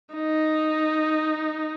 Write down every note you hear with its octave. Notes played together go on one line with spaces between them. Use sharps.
D#4